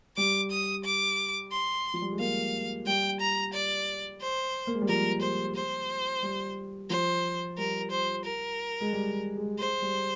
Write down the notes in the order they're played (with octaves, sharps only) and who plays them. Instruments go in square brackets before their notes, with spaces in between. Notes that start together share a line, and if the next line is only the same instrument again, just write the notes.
[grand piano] G3 [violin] D6
[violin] D#6
D6
C6
[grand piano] F3
G3
G#3
[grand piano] A#3 [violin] F5
[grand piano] G3 [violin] G5
[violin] A#5
D5
C5
[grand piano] A#3
G#3
G3
[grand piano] F3 [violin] A#4
[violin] C5
C5
[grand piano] G3
[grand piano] F3 [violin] C5
[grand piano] G3 [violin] A#4
[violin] C5
A#4
[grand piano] G#3
G3
G#3
[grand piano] G#3 [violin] C5
[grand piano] G3